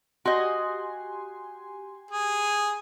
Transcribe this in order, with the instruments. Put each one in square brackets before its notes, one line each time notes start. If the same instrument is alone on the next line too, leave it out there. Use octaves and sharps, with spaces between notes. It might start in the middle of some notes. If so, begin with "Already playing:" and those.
[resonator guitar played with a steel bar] F#4 D#5 [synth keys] G4 G#5 C6
[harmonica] G#4